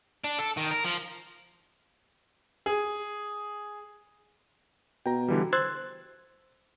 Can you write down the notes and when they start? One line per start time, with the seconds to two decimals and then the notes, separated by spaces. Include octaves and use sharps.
0.24 D4
0.39 A4
0.57 D#3
0.71 A#4
0.85 F3
2.66 G#4
5.06 B2 G5 A#5
5.28 D3 E3 G3
5.53 C5 C6 E6 F#6 G#6 A6